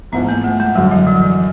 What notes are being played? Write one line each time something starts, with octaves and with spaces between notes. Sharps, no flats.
A1 G#2 F3 B3
A#3
A3
G#3
F#2 D3 F#3 G3
F3
E3
E3